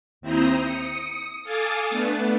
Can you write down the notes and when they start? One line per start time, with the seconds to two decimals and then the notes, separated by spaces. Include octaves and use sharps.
0.21 D#2 C4 E4 C5 A#5 D#6
0.62 D#6 C#7
1.43 A4 F5 G#5 A5 D6 D#6
1.89 A3 B3 D4